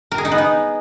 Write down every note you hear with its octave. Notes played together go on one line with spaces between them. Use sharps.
A#4
G#4
D#4
B3
D#4